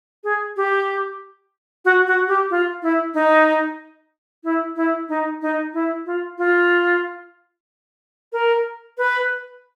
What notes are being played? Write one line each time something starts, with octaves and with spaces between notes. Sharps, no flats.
G#4
G4
F#4
F#4
G4
F4
E4
D#4
E4
E4
D#4
D#4
E4
F4
F4
A#4
B4